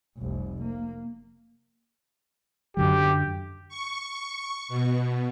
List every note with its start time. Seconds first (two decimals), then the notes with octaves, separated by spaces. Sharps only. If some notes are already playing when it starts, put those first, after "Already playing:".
0.17 F1 C2
0.61 A#3
2.77 F#2 D3 F#3 G4
3.69 C#6
4.69 B2